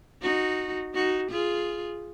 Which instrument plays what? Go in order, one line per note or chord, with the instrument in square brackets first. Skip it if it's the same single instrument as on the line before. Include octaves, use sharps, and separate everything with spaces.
[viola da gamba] D#4 F#4
D#4 F#4
F4 G#4